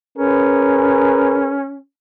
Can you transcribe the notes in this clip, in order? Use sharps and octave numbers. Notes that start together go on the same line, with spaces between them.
C#4 G#4 A#4 B4